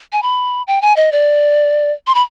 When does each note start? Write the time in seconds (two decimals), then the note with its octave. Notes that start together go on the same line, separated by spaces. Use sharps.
0.13 G#5
0.23 B5
0.67 G5
0.82 G#5
0.96 D#5
1.12 D5
2.07 C6
2.15 B5